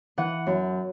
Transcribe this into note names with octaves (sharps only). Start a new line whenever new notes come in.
E3 F#5
F#2